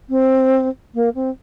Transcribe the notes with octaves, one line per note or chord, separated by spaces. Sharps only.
C4
A#3
C4